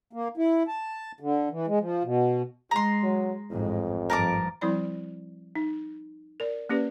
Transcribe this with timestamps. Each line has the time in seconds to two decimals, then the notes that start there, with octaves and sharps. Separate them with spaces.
0.13 A#3
0.37 E4
0.68 A5
1.20 D3
1.50 E3
1.67 G#3
1.80 F3
2.04 B2
2.71 G#3 A#5 C6
3.03 F#3
3.51 A1 F2 G#2
4.10 G#1 G2 F3 A#4 A5 D6
4.61 F3 G3 C4 E4 D5 B5
5.55 D#4
6.40 A#4 D5
6.69 A#3 C#4 G4 B4 D5